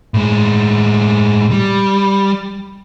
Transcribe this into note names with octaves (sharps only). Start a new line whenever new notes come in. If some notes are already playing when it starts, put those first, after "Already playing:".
A2 G#3
G3